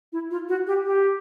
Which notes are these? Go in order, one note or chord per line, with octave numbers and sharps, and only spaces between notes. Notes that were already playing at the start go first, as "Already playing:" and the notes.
E4
F4
F#4
G4
G4